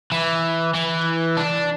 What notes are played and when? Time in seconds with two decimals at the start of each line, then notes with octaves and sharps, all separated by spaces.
0.12 E3
0.74 E3
1.37 D4